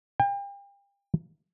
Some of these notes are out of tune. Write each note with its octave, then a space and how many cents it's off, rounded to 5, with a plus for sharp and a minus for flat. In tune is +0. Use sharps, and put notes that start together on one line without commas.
G5 +35